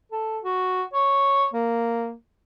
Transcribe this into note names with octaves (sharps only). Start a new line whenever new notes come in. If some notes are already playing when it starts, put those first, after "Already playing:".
A4
F#4
C#5
A#3